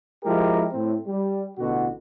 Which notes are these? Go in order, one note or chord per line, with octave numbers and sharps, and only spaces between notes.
F3 G#3 E4 G4 A#4
A2 C4
G3
A1 B2 D3 F#4